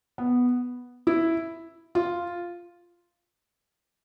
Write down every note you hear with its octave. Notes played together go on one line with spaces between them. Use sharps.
B3
E4
F4